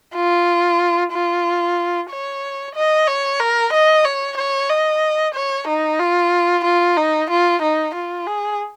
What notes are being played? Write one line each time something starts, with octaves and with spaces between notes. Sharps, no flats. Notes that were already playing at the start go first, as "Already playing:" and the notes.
F4
F4
C#5
D#5
C#5
A#4
D#5
C#5
C#5
D#5
C#5
D#4
F4
F4
D#4
F4
D#4
F4
G#4